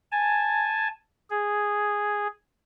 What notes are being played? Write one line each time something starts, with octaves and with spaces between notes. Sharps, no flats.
G#5 A5
G#4